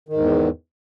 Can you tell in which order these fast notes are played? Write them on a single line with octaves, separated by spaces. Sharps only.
D#3 G#2 E2